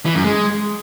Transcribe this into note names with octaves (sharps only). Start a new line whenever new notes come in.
E3
F#2
G#3